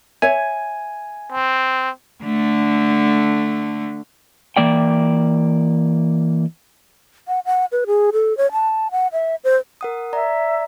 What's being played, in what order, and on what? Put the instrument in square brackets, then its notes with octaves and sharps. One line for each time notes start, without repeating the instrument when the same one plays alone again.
[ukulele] C#5 E5 [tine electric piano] G#5
[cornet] C4
[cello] D3 A3
[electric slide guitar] E3 A#3 D5 G5
[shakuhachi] F#5
F#5
B4
G#4
A4
C#5
A5
F#5
E5
C5
[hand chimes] A#4 F#5 D#6
[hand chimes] D5 A#5 [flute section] E5